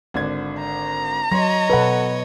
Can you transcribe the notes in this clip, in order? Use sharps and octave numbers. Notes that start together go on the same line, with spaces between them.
G#1 D3 G#6
A#5
F#3 C#5 D#5 C6 A#6
B2 A4 B4 F#5